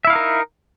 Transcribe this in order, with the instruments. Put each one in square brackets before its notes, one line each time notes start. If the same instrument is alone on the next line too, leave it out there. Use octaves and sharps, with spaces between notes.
[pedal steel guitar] E5
E4
F5
D#4
A#4